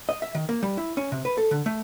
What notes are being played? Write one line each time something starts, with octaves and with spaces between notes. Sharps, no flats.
D#5
E5
D#3
A#3
G3
E4
C#4
C3
B4
A4
D3
A3